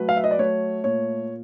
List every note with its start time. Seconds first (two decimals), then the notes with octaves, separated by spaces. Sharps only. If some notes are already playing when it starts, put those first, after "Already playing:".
Already playing: F#3 A3 B4
0.09 F5
0.17 E5
0.24 D#5
0.31 D5
0.39 A3 C#5
0.84 A#2 C#5